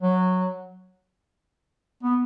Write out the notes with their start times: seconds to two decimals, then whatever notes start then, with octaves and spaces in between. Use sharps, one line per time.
0.01 F#3
2.03 B3